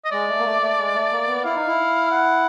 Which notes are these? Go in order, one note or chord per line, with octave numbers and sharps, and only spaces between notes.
D#5
G#3 D5
A3
A#3
A3
A3
G#3
A3
A#3
B3
E4 F5
D#4
E4
F#5